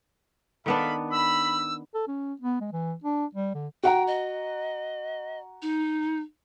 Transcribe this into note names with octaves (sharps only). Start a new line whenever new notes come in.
D#3 B3 D4 A4 F5 B5
B5 E6
A4
C#4
B3
G#3
E3
D4
G3
D3
F#4 F#5 G5 A#5
D#5
D#4